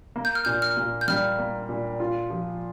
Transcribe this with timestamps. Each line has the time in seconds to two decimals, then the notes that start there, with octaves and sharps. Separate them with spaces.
0.16 A#3
0.25 G6
0.35 F6
0.45 A#2 G6
0.62 F6
0.77 A#2
1.01 G6
1.08 G3 F6
1.38 A#3
1.69 A#2
2.00 F4
2.30 F3